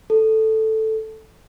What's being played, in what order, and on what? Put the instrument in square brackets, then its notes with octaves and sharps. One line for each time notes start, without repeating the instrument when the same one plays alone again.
[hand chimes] A4